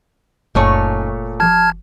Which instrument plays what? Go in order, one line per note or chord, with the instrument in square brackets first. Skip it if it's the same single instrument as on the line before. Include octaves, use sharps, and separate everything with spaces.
[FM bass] F#1 [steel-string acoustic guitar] F#2 D#4 G#5 [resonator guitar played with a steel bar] A#2 A3 C#5
[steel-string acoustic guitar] F3 G4 [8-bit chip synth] A5 F6 G#6